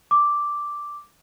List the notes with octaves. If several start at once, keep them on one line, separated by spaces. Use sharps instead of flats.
D6